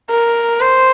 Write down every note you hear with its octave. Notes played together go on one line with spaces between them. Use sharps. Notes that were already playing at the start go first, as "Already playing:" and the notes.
A#4
C5